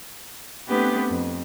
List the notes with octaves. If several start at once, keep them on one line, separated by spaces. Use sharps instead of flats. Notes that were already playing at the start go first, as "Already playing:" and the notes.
A3 B3 C4 D4 G4 B4
F2